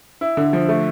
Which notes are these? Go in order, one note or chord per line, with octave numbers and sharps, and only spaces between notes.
E4
D3
F3
A3